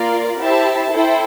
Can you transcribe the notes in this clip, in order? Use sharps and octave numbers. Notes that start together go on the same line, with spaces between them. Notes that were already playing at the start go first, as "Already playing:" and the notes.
Already playing: A#3 F4 A#4 D5
E4 G4 C5 E5 A5
E4 A4 C5 G5